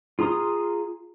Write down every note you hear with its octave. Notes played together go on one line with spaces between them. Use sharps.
F4 G#4 A#5 C6 D#6